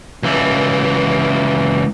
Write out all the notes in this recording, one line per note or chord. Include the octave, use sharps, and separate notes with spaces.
C#2 E3